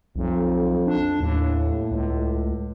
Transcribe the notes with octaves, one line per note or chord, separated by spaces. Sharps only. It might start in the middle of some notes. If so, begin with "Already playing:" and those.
B1 F2
D4
D#2 A2
C#2